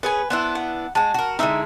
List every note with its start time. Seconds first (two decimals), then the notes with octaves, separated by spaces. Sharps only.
0.03 C#4 G#4 B4 G#5
0.30 B3 D4 E4 C5 F#5
0.55 F#5
0.95 G#3 F#4 A5
1.14 F#4 A#4
1.39 D3 G#3 D#4 E4 E5